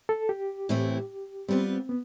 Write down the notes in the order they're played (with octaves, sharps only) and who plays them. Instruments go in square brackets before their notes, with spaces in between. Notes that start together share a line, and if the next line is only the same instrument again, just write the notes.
[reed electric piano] A4
G4
[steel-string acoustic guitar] A2 E3 A3 C4 E4
[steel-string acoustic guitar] G3 B3 F4 B4 [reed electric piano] C4
[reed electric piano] B3